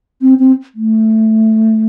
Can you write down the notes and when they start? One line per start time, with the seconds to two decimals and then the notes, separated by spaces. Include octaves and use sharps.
0.22 C4
0.39 C4
0.75 A3